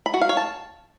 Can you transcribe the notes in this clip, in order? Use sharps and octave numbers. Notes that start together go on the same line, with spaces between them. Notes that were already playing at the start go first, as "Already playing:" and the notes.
B5
F#4
F5
C#5
A5